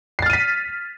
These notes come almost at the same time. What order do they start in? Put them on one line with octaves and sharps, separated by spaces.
C7 A6 F6 D#7 B6